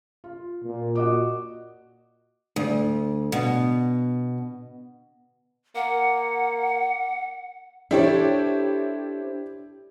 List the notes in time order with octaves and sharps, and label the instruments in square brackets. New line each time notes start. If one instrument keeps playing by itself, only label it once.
[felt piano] F4
[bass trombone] A#2
[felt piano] F#4 D#5 D6
[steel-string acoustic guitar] D2
B2
[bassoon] A#3 [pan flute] F#5
[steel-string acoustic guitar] D4 A4 C5 [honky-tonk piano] E4 G4 C#5